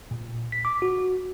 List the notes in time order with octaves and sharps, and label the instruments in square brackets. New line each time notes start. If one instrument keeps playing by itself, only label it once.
[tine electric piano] A#2
B6
D6
F#4